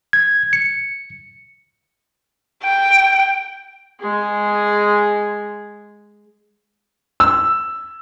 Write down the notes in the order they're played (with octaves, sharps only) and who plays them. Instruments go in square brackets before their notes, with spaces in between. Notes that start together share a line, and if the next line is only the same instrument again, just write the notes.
[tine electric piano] G#6
C#7
[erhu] G5
[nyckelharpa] G#3 G#4
[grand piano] E6